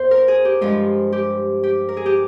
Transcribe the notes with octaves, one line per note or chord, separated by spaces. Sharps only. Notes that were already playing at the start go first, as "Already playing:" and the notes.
Already playing: E2 C5
A#4
G#4
G4
G2 F3 G#3 F4
G4
G4
A#4
G#4
G4